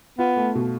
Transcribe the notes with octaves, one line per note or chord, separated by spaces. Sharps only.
B3 F4
A3
B2